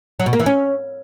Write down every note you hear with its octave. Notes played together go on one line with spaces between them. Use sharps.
F#3
B2
A#3
E3
C#4